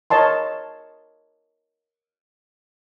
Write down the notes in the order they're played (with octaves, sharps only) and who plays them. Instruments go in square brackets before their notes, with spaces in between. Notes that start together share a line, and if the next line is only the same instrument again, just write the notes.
[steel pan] A#4 C#5 D#5 A5 C6